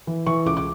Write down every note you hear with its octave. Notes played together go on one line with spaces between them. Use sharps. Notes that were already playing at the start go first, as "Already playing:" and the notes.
E3
E3 C#6
C#2 D6
D6